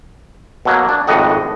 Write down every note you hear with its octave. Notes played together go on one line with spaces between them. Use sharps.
B2 F#3 A#3
D4
G#1 F2 A2 D#5 F#5